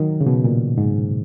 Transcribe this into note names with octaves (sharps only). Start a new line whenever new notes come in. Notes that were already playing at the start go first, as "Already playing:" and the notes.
Already playing: D#3 F#3
C#3
B2
A#2
G#2